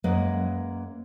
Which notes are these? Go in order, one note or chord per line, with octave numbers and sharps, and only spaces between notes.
F#2 G#3 A#3 B4 D#5 F#5